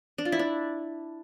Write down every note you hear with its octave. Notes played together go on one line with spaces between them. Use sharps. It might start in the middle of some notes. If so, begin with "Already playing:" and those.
D4
F4
E4
D4